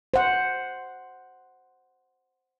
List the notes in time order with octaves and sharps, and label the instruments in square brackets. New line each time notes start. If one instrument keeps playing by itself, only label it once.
[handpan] C5 F#5